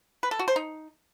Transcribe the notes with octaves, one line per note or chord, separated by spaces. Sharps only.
B4
A4
F#4
C5
D#4